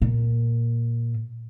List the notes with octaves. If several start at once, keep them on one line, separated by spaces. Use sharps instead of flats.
A#2